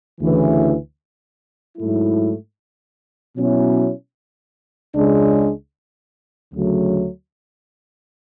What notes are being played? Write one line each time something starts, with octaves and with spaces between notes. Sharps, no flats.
D2 C#3 E3
G#2 F#3 A3 E4
B2 F#3 C#4 E4
C#2 C#3 G#3 D4
D2 C#3 F#3 A3